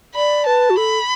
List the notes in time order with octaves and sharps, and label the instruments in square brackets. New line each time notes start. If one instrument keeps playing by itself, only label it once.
[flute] D5 [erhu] B5
[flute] B4 [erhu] A5
[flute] F#4
[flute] A4 [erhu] B5